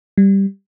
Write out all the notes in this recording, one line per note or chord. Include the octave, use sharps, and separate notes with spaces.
G3